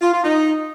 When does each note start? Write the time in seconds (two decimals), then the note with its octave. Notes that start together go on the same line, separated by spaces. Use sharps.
0.02 F4
0.13 F4
0.24 D#4